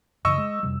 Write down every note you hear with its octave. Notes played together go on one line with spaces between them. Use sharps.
F#2 C#3 E3 D#5 C#6 E6
G#3
F2 C3 G3